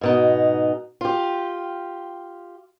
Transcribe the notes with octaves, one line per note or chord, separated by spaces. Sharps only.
G#2 B2 D#4
F4 G4